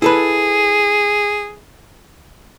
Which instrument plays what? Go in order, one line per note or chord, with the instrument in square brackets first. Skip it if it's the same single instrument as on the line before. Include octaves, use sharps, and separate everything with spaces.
[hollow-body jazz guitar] E4 A4 B4 [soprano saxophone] G#4